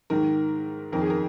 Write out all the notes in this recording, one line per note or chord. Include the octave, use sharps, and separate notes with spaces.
G#2 D#3 A#4
F2 D#3 A#4
G#4
A#4